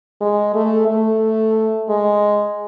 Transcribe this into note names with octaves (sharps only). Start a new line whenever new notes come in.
G#3
A3
A3
G#3